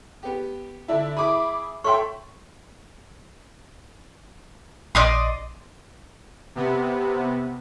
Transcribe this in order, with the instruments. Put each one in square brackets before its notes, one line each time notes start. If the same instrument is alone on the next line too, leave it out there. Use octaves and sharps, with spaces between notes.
[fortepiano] B3 G4
[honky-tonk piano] D3 D4 E4
[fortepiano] E4 G#4 [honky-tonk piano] B5 D6
[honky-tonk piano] A4 E5 G5 [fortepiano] C#5 [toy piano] C6 C#6
[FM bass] A#1 [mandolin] D5 D#5 C6
[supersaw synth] C3 B3